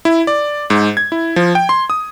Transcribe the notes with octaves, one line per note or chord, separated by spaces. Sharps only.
E4
D5
G#2
G#6
E4
F3
G5
C6
D#6